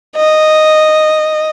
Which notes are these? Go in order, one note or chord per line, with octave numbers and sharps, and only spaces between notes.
D#5